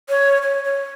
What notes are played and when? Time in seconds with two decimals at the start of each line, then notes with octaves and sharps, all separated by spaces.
0.09 C#5
0.42 C#5
0.64 C#5